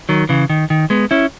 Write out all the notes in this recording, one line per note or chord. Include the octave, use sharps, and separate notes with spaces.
D#3 F#3
C#3 E3
D#3
D#3
G#3 B3
C#4 E4